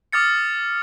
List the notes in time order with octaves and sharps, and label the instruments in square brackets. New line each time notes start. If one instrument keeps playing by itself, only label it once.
[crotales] D6 D#6 F6 A6 C#7